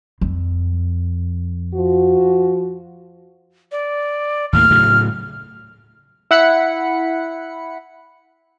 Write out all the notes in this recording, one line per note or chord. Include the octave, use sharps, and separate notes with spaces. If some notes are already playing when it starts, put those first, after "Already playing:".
F2
F3 F#4
D5
D#2 A2 A#3 F6
A2 C#3 F#3
E4 F#5 B5 C#7